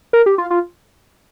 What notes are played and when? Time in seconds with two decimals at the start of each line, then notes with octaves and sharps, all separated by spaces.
0.13 A#4
0.26 G4
0.38 F4
0.50 F4